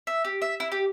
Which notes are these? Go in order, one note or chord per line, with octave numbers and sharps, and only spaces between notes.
E5
G4
E5
E4
G4